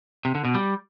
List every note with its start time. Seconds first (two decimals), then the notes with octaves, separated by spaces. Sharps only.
0.25 C3
0.35 D3
0.45 B2
0.54 G3